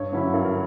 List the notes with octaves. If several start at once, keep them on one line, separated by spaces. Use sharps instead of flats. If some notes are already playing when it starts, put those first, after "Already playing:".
Already playing: G2 C#5
D3 F#3 C#4 E4
G2 A#4
A#4